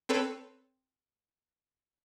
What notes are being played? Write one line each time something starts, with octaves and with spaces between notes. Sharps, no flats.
C4 A4 B4 C#5